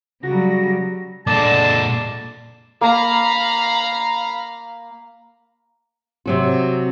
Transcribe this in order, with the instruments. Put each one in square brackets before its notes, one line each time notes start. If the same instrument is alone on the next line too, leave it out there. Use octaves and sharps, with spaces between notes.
[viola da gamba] C#3 F#3 G3 [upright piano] F#4 [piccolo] A#6
[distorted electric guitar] A#2 G#3 [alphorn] D3 [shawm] A5 [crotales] D6 E7
[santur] A#3 [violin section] F5 A#5 B5
[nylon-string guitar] C3 F#3 F#4 [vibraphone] C4 E6